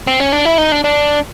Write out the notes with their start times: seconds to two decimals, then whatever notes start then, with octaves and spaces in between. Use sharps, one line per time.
0.07 C4
0.20 C#4
0.33 D4
0.45 E4
0.58 D#4
0.72 D4
0.84 D4